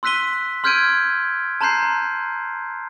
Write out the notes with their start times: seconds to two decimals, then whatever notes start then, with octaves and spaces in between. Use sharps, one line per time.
0.03 C6 E6 F#6 B6 D#7 G7
0.64 C6 F6 G6 G#6 D7 D#7
1.61 A5 A#5 C6 F#6 G6 C7
1.82 A#5